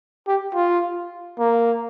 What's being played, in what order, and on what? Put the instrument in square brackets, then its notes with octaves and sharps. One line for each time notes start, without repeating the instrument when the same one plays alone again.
[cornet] G4
F4
A#3